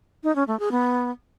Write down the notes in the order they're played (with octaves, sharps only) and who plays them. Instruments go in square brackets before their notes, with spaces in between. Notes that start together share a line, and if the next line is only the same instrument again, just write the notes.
[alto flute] D#4
C#4
A3
G#4
B3